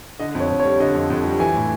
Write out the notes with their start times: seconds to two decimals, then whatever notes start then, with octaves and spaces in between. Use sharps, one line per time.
0.20 D3 D#5
0.35 F2
0.40 C#5
0.50 F2
0.60 C#5
0.64 G3
0.80 D3 D#5
0.95 F2
1.10 F2
1.25 G3
1.40 E3 G#5
1.55 A2